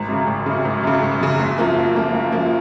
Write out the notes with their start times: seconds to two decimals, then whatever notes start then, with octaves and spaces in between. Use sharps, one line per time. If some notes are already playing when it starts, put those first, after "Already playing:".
Already playing: G#1
0.09 F#2 C#3
0.27 G#1
0.46 F#2 C#3
0.65 G#1
0.83 F#2 C#3
1.02 G#1
1.21 F#2 C#3
1.39 F#1
1.58 F#2 F3 A#3
1.76 F#1
1.95 F#2 F3 A#3
2.14 F#1
2.32 F#2 F3 A#3